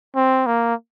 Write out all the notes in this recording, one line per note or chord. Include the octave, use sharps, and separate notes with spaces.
C4
A#3